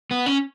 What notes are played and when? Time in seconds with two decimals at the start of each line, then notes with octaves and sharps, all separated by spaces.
0.11 B3
0.26 C#4